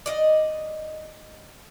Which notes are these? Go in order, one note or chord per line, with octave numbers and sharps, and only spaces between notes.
D5 D#5